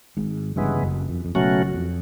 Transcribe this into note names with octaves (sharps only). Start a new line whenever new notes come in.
G#1 G#2
G1 G2 C#3 E3 G#3 B3
F#1 F#2
F2
F2
F#1 F#2 B2 F#3 A3 C#4 F#4
F2